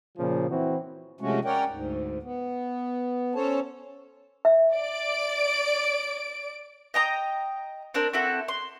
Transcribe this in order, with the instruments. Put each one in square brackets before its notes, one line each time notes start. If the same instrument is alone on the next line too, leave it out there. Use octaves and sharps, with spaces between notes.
[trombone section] A#2 C#3 F3
E3 C4 E4 F#4
[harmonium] C3 F3 G#3 A3 C#4 F#4
C#4 A#4 C#5 D5 F#5 G5
D2 G#2
B3
C#4 A4 C5 C#5 A5
[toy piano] E5
[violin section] D5 D7
[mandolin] D#5 G5 A#5 D#6
C4 D4 A#4 C5
C4 E4 F#4 A4
C6